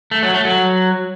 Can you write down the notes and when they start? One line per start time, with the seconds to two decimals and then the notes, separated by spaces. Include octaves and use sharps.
0.11 A3
0.23 F#3
0.34 A3
0.45 F#3